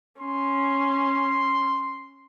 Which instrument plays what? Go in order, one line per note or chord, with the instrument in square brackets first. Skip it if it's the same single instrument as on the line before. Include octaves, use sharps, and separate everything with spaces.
[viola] C#4 [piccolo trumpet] C6